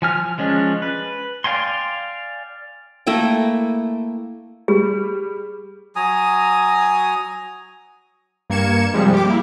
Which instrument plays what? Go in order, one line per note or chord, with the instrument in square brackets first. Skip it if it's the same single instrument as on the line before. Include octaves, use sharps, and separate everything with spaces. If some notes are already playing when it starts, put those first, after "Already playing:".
[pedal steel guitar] F3 G#5 F6
F3 G#3 C#4 D4
B4
D5 F5 G5 G#5 C6
[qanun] A3 A#3 E4 G5
[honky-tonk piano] G3 [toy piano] G#4
[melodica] F#3 G#5 A#5 D#6
[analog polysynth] G2 A#3 G#6 C#7 E7
C3 F3 G3 G#3
G4 D6
A#3 E4